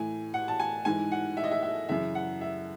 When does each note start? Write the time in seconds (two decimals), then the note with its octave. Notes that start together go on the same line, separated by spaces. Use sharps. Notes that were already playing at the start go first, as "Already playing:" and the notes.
Already playing: A2 E3 G#5
0.34 F#5
0.48 A5
0.60 G#5
0.85 G#2 E3 G#5
1.12 F#5
1.37 E5
1.44 D#5
1.51 E5
1.63 E5
1.89 F#2 C#3 E3 E5
2.15 F#5
2.41 E5